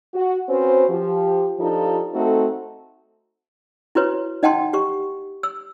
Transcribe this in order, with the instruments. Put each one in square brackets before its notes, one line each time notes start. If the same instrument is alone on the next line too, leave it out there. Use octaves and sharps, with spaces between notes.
[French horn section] F#4
C4 C#4 F#4 B4 C5
F3 G4
F3 D4 D#4 F4 G4 A4
A3 C4 D#4 F#4 A4
[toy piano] E4 F#4 B4 C#5
D#4 D#5 F#5 G5 A5 C6
G4 C#6
E6